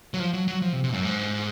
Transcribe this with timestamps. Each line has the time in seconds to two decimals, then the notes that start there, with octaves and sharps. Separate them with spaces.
0.14 F#3
0.19 F3
0.33 F#3
0.48 F#3
0.62 F3
0.73 C3
0.84 C3
0.94 F#2
1.05 G#2